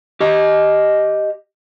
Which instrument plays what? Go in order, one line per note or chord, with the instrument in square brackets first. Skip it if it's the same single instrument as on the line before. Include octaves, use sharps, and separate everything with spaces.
[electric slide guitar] G4 D#5